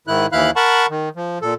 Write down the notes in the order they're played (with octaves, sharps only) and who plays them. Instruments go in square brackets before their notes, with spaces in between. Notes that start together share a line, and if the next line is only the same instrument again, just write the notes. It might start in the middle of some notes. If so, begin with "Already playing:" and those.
[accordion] G#2 D#3 E4 F#6
D#2 E3 E4 F5 B5 F#6
A#4 F#5 A5 B5 C#6
D#3
F3
A#2 A4